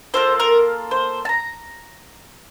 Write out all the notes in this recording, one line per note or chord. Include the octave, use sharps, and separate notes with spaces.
A#3 F4 A4 C5
A#4
C5
A5
A#5